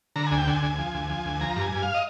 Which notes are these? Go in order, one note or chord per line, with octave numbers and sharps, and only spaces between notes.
D3 A#5
D2 G#5
G5
D3 G#5
D2
F3
D2
F3
D2
F3 A#5
G2
G#5
G2
F5
D#5